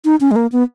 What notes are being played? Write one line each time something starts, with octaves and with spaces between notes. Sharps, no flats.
D#4
C#4
G#3
A#3
B3